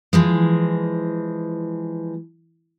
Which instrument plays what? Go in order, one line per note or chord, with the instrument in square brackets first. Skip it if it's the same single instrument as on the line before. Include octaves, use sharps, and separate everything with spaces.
[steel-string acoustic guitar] E3 F3 G#3